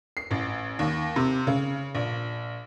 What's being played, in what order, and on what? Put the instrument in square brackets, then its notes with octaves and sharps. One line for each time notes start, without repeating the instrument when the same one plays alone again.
[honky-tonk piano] C7
A1
D#2
C3
C#3
A#1